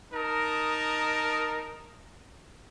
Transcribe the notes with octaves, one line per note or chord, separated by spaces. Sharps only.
D#4 A#4 A5 D#6